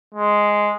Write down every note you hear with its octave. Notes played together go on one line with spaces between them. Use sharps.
G#3